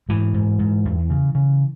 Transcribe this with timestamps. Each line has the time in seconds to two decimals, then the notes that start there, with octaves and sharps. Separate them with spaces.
0.09 G#2 E3
0.34 G#2
0.59 G#2
0.85 E2
1.10 C#3
1.35 C#3